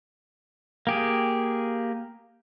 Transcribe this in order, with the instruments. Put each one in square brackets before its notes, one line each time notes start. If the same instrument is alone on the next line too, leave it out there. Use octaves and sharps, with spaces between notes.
[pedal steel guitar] A#3 G4 G#4